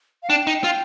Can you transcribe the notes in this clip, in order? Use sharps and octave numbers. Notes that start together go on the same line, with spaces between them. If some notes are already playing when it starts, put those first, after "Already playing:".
F5
D4 G5
D#4
F4